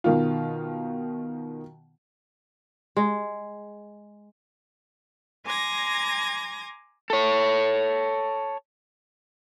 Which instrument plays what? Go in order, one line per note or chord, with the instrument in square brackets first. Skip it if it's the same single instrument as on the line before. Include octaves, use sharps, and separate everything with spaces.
[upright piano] B2 D#3 F4
[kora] G#3
[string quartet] G#5 A#5 C6 D6 G#6 A#6
[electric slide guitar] A4 C#5